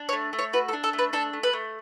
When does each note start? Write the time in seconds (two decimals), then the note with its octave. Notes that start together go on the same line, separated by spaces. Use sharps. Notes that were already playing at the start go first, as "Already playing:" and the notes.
Already playing: D4
0.09 C#5
0.13 A3
0.33 A3
0.39 C#5
0.53 F#4 B4
0.69 A4
0.73 D4
0.84 A4
0.93 A3
0.99 B4
1.13 D4 A4
1.33 A3
1.43 B4
1.53 A3